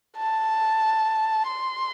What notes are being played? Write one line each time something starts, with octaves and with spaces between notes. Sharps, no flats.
A5
C6